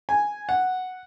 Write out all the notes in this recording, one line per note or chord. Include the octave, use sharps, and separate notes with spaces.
G#5
F#5